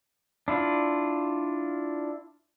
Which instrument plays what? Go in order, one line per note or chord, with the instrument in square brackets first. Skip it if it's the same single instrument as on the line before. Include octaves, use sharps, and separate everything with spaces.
[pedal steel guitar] D4 E4 F4